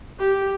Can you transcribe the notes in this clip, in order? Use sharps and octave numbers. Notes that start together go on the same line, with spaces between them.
G4